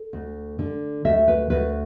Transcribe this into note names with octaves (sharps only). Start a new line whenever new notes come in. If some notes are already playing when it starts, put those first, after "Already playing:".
Already playing: A4
D2
D3
D2 E5
B4
D2 B4